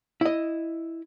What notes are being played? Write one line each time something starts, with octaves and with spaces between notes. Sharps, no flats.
E4 D#5